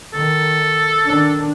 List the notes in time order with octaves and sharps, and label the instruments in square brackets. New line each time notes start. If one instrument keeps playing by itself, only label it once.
[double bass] D#3 [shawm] A4
[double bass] D#3 D4